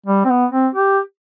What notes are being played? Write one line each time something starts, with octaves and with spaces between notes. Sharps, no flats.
G3
C4
B3
C4
G4